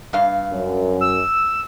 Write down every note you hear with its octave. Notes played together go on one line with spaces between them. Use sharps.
G2 F5
F#2
E6